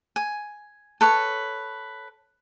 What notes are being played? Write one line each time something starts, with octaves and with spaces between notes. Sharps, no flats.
G#5
A4 B4 C#5